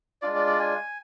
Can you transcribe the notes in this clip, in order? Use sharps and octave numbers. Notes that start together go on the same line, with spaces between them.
G#3 D4 F4 D5
D5
D5
G#5